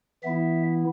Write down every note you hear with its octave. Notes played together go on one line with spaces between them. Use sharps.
E3 B3 E4 E5